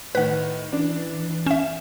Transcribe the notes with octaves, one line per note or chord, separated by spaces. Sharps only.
A2 D#3 B4 F#5
E3 D4 D5
C#4 E5 E7